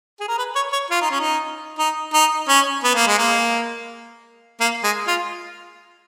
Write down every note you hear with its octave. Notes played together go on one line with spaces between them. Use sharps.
G#4
A#4
B4
C#5
C#5
F4
D#4
C#4
D#4
D#4
D#4
C#4
B3
A#3
G#3
A#3
A#3
G#3
F4